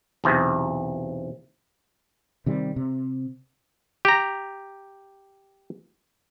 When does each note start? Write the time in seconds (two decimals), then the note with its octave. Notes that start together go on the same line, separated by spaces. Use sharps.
0.24 B1 E2 C3
2.46 C3 D#3 G3
2.76 C3
4.05 G4 A#5